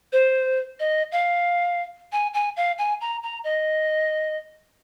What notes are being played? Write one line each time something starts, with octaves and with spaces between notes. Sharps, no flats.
C5
D#5
F5
G#5
G#5
F5
G#5
A#5
A#5
D#5